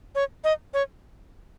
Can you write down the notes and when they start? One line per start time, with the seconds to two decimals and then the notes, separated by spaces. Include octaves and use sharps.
0.15 C#5
0.44 D#5
0.74 C#5